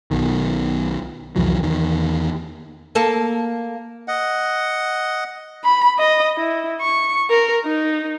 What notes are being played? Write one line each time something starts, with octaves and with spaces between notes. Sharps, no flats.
B1 B2 D#3
C2 F2 E3 F#3
E2 D#3
A#3 A4
D#5 F#5
B5
D#5
E4
C#6
A#4
D#4